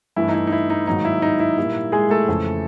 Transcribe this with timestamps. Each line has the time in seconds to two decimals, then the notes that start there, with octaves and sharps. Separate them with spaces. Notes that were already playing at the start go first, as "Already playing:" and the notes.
0.16 G2 E3 A3 E4
0.28 D#4
0.34 E4
0.47 D#4
0.52 E4
0.70 D#4
0.87 G#2 D#3 F#3 A#3 D#4
1.05 E4
1.22 D#4
1.39 E4
1.58 A#2 G3 A#3
1.92 G#3 G#4
2.10 A3 A4
2.28 F2 C#3 E3 A3